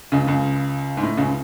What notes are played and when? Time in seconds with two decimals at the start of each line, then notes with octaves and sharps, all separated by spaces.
0.12 C#2 C#3
0.27 C#2 C#3
0.97 G#2
1.03 A2
1.17 C#2 C#3